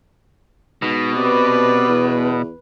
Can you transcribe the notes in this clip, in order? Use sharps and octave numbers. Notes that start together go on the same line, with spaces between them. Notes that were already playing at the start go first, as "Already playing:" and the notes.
G#2 B2
C3 B4 D5
E2